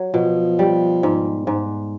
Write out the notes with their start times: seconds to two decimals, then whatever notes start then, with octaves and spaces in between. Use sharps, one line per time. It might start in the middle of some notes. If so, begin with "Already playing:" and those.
Already playing: F#3
0.14 B2 F3
0.59 G3
1.03 G#2
1.47 G#2